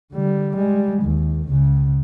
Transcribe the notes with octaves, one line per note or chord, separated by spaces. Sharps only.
D3 G3
G3 G#3
D#2
C#2 C#3